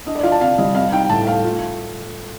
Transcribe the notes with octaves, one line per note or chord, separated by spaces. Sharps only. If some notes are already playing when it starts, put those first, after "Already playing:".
D4 D#5
D5
F4 F5
A5
C3 F5
G3 D#5
C4 F5
D#4 G5
A2 A5
A3 F5
F4